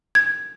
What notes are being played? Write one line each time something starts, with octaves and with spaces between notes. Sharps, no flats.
G#6